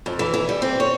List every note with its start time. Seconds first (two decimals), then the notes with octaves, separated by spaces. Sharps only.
0.06 F2
0.19 E3
0.34 E3
0.49 G3
0.62 C4
0.80 C#5